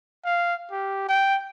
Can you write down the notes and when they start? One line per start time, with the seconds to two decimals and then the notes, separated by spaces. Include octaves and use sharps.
0.24 F5
0.71 G4
1.08 G5